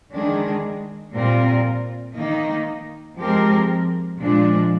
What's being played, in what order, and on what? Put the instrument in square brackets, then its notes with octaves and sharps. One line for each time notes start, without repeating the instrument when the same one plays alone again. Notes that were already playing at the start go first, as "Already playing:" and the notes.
[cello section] D#3 G#3 D4 G#4
A#2 G3 C4 F4 A#4
D#3 A#3 D#4
F3 G#3 C4 G4 A#4
A#2 F3 G#3 D4